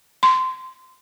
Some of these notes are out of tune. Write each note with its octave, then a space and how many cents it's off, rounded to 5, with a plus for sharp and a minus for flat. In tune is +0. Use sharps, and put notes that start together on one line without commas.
C6 -20